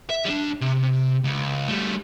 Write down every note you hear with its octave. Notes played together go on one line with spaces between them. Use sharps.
E5
G3 D4
C3
C#2
G3 A3